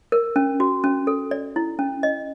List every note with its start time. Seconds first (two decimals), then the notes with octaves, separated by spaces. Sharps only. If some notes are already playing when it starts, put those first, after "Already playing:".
0.12 A#4
0.36 C#4
0.60 F#4
0.84 C#4
1.07 A4
1.31 D5
1.56 E4
1.79 C#4
2.03 D#5